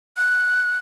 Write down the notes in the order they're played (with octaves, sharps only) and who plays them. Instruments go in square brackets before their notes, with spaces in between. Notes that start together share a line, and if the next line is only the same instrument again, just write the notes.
[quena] F#6